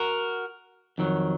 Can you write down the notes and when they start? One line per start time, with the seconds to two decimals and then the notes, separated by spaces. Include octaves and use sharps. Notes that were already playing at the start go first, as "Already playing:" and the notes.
Already playing: F#4 A#4
0.98 F2 D#3 F#3